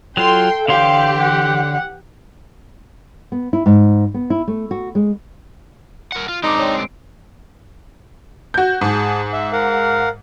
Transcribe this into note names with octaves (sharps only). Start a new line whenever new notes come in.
F#3 F4 A4 G5 C6
D3 E3 G4 C#5 F5 C6
F#5
B3
E4
G#2
B3
E4
A3
F#4
G#3
A#4 F#5
F4
G#3 C4 D4 D#4 A#5 D6
C#5 D5 G5
C7 D7
F#4 G6
G#2 G#4 A5
E5
A#4 F5 F#5